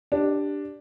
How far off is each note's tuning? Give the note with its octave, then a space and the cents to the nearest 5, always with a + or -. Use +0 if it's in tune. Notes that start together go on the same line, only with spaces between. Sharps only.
D4 +0 G4 +0